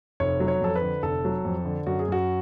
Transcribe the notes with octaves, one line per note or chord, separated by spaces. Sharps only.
F1 C#5
F#3
C#5
F2 A4
B4
D3
F1 A4
F#3
F2
D3
F#2 F#4
G#4
F#2 F#4